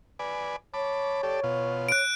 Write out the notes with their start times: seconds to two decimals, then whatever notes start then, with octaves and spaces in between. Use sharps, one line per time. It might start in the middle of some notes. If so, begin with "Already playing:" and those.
0.19 B4 D5 G#5
0.74 C#5 A5 B5 D6
1.23 G4 A4 D5
1.43 B2 F4
1.89 F#6 D7